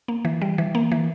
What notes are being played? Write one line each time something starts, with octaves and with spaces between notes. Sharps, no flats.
A#3
E3
G3
E3
A#3
E3